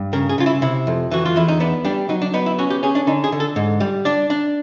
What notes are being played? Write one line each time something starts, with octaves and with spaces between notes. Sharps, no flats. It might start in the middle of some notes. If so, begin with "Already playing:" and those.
Already playing: G2
C#3 A#4
G#4
C#3 F4
E4
C3 E4
F2
E3 F#4
F4
E2 E4
D#4
B3 D4
G3 D4
F#3 D#4
D4
B3 D#4
E4
C#4 F#4
G4
C#4 G#4
D4
D3 D#4
G#4
D3
A4
G#2
G3
D4 D5
D4